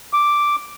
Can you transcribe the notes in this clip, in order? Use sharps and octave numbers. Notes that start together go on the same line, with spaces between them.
D6